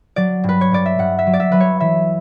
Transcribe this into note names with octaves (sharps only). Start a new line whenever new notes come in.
F#3 D5
G2
B4
C#5
G2 D5
E5
G2 F#5
E5
F#3
D5
E5
F#3 B4
C#5
E3 E5